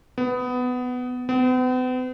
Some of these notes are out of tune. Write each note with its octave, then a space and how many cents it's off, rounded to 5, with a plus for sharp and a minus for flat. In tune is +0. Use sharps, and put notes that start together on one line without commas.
B3 +15
B3 +45